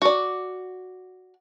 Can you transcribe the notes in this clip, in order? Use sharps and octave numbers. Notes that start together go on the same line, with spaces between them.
F#4 D5